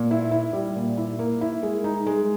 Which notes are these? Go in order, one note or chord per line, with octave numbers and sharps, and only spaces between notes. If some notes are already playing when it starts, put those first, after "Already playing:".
Already playing: A#2
E4
E4
G3
A#2
E4
A#3
E4
G#3
D#4
G#3